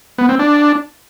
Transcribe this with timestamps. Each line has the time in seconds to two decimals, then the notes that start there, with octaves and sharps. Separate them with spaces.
0.18 B3
0.29 C4
0.39 D4